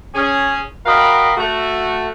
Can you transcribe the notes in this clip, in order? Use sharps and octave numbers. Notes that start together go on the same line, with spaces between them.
C#4 G#4
F#4 A#4 D#5 F5 G5 B5
A3 F#4